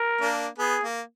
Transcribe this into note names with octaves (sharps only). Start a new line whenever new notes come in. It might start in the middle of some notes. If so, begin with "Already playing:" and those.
Already playing: A#4
A#3 D4
B3 G#4
A#3